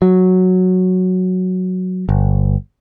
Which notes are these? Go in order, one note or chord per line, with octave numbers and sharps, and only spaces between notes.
F#3
G1